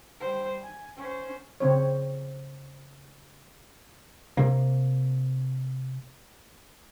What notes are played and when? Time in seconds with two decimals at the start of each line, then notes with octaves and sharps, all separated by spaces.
0.20 G3 C5
0.62 G#5
0.96 C#4 C5
1.60 C#3 C4 C#5
4.37 C3 A#3